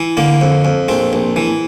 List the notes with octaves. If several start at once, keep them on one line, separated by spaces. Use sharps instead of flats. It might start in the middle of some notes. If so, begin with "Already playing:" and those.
Already playing: E3
D3 A#3
F2
F2
A#1 C4
A#1
E3